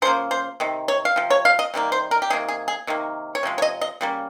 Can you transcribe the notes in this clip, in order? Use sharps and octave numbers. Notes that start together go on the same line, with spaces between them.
C#3 F3 A#3 C5
C5
C3 D#3
C#5
F5
C3 F3
C#5
F5
D#5
C3 D#3 G3 A#3
C5
A#4
G4
C3 D#3 A#3 G#4
G#4
G#4
C3 D#3 A#3
C#5
C3 F3 G#3
C#5
D#5
D#5
C#3 G3 A#3